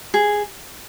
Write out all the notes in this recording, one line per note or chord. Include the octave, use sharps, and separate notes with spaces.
G#4